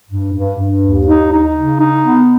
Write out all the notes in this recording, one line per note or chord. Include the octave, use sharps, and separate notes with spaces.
G2
G2
G2
D#2
D#4
D#4
C#3
D#4
B3